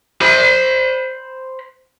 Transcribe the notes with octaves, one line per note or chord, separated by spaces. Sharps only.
C5 B5